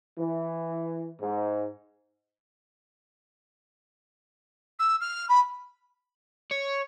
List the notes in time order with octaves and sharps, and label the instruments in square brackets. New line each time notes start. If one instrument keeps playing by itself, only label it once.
[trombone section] E3
G#2
[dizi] E6
F6
B5
[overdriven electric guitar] C#5